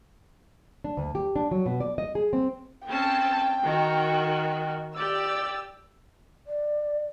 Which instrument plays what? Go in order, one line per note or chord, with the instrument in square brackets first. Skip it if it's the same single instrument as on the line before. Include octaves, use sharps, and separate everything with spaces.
[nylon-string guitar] D4
D2
G4
D4
F#3
B2
D5
D#5
G#4
C4
[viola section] C4 C#4 A5 [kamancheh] G5
[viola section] D#3 F#4
[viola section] G4 D5 [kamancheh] E6
[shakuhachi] D5